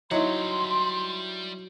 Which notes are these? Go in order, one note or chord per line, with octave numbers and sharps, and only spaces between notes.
F#3 G3 D#4 E4 F#5 C6